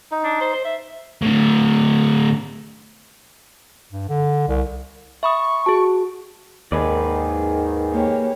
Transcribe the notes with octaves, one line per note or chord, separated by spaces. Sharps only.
D#4
D4
C5
C5
E5
A2 D3
G2
D3
C2
E5 B5 C#6 D#6
F#4 G#4 A5
D#2 G#2 D#3 G#4 B4 D5
A#3 G4 C#5